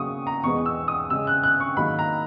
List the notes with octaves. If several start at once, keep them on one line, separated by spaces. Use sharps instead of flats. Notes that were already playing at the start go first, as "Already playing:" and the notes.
Already playing: C#3 F#3 A#3 C#6 D#6
A#5
E2 B2 G#3 B3 C#6
E6
D#6
C#3 G#3 C#4 E6
F#6
F#6
C#6
G#2 D#3 F#3 A#3 B5
A#5